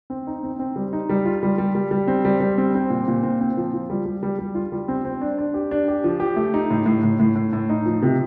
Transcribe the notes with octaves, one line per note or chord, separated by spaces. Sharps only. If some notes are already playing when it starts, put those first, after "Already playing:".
C4
D#4
C4
C4
G3
D#4
G3
F4
G3
G3
G3
G3
C4
G3
G3
C4
C4
A#2
A#2
C4
C4
F3
F3
G3
G3
G3
G3
F4
G3
C4
C4
D4
D4
G4
D4
G4
F3
G4
A3
D#4
A2
A2
A2
A2
A2
A2
D#4
F3
C3